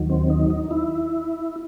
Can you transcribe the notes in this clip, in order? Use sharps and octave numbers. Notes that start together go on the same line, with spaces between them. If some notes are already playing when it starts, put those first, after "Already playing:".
Already playing: D#2 D#3 F#3
C4
D#4
D#4
E4